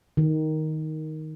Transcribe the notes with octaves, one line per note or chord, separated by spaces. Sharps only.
D#3